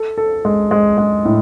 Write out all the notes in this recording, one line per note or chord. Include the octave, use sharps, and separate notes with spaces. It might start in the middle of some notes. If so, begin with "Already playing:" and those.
Already playing: A4
A4
G#3
G#3
G#3
A2